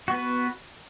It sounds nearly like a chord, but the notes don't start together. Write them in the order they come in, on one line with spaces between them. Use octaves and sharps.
F#4 B3 B4